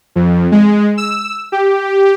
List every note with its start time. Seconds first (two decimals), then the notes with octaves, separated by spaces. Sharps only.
0.16 F2
0.52 G#3
0.98 E6
1.52 G4